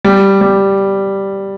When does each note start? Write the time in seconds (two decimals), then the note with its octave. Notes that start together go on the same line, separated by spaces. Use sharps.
0.05 G3
0.41 G3